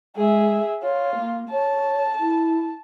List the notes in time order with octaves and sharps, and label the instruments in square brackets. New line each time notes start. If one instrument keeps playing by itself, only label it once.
[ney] G#3 [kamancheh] G#4 E5
[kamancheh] F4 [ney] C#5
[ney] A#3
[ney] C#5 [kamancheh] A5
[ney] E4